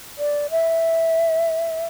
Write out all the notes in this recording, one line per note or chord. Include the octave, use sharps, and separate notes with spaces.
D5
E5